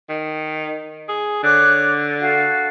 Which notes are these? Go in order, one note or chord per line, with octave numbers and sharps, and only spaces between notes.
D#3
G#4
D3 C#5 D6 F#6
F#4 A4 F5